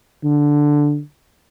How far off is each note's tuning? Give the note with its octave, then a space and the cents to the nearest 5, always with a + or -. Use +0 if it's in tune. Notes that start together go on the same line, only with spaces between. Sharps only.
D3 +0